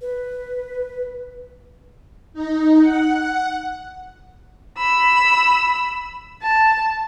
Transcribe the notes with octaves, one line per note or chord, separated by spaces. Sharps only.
B4
D#4
F#5
B5 E6
A5